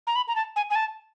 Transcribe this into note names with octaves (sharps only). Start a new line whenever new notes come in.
A#5
B5
A#5
A5
G#5
G#5
A5